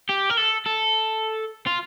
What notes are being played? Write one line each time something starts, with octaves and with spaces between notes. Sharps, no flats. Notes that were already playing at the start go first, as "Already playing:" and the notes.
G4
A#4
A4
A4
F4